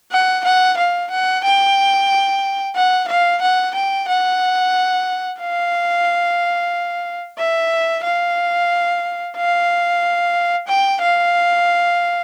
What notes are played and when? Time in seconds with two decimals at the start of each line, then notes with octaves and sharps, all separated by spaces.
0.12 F#5
0.45 F#5
0.77 F5
1.11 F#5
1.44 G5
2.76 F#5
3.08 F5
3.41 F#5
3.75 G5
4.08 F#5
5.40 F5
7.38 E5
8.04 F5
9.37 F5
10.68 G5
11.01 F5